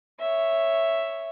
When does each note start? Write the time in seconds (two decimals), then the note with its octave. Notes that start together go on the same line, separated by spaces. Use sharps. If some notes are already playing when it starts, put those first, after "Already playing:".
0.20 C#5 E5